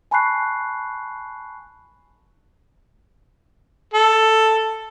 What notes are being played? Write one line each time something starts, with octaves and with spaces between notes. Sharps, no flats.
G#5 A5 B5 C#6 F#6 C7
A4